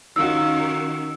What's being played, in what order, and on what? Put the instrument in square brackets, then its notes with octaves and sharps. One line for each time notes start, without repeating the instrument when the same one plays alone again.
[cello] D#3 C#4 [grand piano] D#4 F4 F#4 [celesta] E6